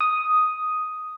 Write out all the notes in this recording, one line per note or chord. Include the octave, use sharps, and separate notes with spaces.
D#6